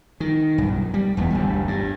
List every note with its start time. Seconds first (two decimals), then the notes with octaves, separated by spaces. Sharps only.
0.20 D#3
0.58 B1 G2
0.94 G3
1.17 E1 E2 F#3 B3
1.30 G1 D2 G3
1.68 G2